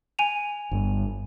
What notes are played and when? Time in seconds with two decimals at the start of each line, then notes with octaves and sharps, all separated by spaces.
0.19 G#5 D#7 F7
0.71 G1 G2